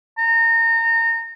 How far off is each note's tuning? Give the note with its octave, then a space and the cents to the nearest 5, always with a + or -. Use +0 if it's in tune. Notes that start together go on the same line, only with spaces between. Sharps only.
A#5 -30